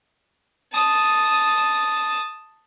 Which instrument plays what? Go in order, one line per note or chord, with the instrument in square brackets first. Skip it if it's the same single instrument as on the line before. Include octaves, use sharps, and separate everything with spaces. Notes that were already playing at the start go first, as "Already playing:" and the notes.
[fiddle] A5 D#6